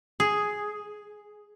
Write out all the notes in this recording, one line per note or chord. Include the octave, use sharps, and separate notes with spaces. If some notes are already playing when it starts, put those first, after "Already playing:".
G#4